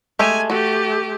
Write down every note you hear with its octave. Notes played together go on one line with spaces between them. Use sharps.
G#3 A3 G4 G#5
A3 F#4 G4